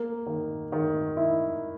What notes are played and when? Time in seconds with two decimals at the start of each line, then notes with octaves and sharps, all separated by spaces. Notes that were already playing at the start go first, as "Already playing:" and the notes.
Already playing: A#3
0.26 D#3
0.72 D#3
1.17 E4